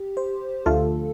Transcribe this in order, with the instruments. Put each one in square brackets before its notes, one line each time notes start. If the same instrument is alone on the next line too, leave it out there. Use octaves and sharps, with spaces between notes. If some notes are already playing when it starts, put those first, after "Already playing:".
Already playing: [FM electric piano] G4
C5
[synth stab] D2 D3 F3 A3 F4 [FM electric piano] A4